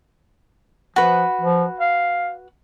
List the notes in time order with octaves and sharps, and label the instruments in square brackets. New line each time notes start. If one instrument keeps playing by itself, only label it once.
[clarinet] F3 [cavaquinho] F#4 B4
[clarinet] F3
F5